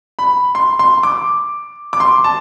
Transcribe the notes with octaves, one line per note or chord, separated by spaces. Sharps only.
B5
C6
C6
D6
D6
C6
A5